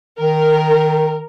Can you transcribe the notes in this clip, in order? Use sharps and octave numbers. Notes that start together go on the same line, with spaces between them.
D#3 A#4